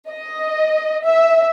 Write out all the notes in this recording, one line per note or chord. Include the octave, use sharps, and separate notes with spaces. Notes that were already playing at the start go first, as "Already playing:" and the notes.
D#5
E5